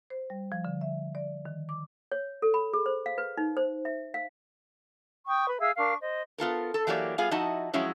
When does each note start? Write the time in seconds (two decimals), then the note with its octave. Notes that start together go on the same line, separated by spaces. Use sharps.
0.10 C5
0.30 G3
0.52 F3
0.65 D3
0.81 E5
1.15 D5
1.45 D#3
1.69 D6
2.12 C#5
2.42 A4
2.54 B5
2.73 G#4
2.86 C5
3.06 F5
3.18 B4
3.38 D#4
3.57 C5
3.85 E5
4.14 F5
5.27 G5 C#6 D#6
5.47 B4
5.59 G#4 E5 F5 E6
5.77 D4 A#4 F5 C#6
6.01 C5 D#5
6.38 B3 F4 A4 A#4
6.74 A4
6.87 E3 F#3 A#3 G4 D5
7.18 G3 B3 F4 G#4 F5
7.31 F3 D#4 E4 F#4 D#5 A5
7.73 F3 F#3 G#3 C#4 E4